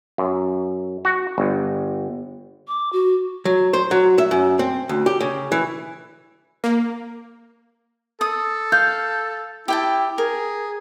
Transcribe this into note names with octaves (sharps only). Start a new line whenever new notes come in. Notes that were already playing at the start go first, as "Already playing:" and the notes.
F#2
F#4
G1
D6
F#4
F#3
C5
F#3
E5
F#2
C4
D2
G4
C#3
E3
A#3
A4 D#6
F5 G6
E4 G4 G5 A5
G#4 A#4